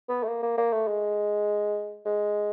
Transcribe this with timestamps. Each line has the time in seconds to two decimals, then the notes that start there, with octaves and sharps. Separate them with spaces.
0.09 B3
0.23 A3
0.28 A#3
0.43 A#3
0.58 A#3
0.73 A3
0.87 G#3
2.05 G#3